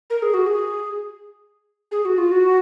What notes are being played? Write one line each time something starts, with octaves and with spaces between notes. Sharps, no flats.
A#4
G#4
F#4
G#4
G#4
F#4
F4
F#4